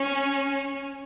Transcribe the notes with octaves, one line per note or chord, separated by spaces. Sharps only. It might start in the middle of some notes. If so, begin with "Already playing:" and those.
Already playing: C#4